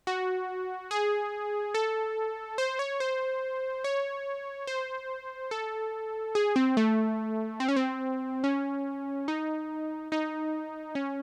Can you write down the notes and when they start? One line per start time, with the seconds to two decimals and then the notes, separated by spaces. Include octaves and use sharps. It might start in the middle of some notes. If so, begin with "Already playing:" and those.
0.07 F#4
0.91 G#4
1.74 A4
2.58 C5
2.79 C#5
3.00 C5
3.84 C#5
4.67 C5
5.51 A4
6.35 G#4
6.56 C4
6.77 A3
7.60 C4
7.68 C#4
7.76 C4
8.44 C#4
9.28 D#4
10.12 D#4
10.95 C#4